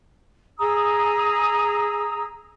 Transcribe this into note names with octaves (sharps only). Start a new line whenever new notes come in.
G#4 A#5 D#6 E6